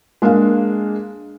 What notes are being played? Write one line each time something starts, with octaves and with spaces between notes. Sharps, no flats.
G#3 A#3 D4 F5